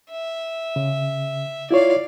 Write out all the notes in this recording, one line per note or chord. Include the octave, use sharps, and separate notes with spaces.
E5
C#3
E4 F4 C#5 D5 F5